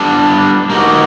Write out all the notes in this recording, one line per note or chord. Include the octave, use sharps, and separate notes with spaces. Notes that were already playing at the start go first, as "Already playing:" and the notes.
Already playing: G3 B3 D4
A#3 D#4 F#4